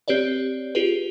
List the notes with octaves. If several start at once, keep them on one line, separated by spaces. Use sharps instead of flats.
C4 G4 B4 C#5 D5
F4 G4 G#4 B4